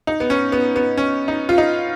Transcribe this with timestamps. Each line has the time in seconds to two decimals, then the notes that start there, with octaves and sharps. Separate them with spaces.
0.07 D#4
0.20 B3
0.30 C#4
0.52 B3
0.76 B3
0.98 C#4
1.28 D#4
1.49 F4
1.58 D#4